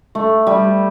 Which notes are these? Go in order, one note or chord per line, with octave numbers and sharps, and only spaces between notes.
A3
G3